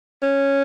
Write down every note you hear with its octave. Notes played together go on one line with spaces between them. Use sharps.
C#4